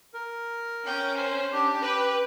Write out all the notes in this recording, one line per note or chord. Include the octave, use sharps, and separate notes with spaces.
A#4
C#4 G5
C5
D4 G4
B4 G5